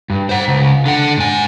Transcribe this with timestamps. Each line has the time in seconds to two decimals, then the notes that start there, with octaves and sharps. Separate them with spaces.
0.10 G2
0.29 C5 F#5
0.48 C#2
0.86 D3 F#5
1.17 G#2 G#5